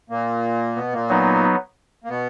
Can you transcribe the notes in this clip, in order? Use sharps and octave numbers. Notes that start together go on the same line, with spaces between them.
A#2 A#3
B2 B3
A#2 A#3
F#3 B3 D#4
A#3
B2 B3